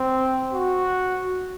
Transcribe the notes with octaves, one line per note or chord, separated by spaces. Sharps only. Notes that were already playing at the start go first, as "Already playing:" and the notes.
Already playing: C4
F#4